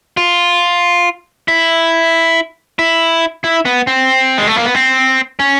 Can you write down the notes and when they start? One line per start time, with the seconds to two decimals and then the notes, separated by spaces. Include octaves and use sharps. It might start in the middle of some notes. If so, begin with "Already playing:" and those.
0.17 F4
1.48 E4
2.79 E4
3.44 E4
3.65 B3
3.87 C4
4.38 G#3
4.47 A3
4.57 A#3
4.65 B3
4.75 C4
5.39 C#4